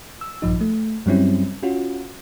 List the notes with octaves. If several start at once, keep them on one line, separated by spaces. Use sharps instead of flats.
E6
A#1 G2 F3 D#4
A3
G2 F#3 G3 C4 C#4 E4
C#4 F4 F#4